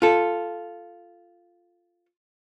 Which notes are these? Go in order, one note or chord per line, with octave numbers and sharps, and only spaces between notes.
F4 A4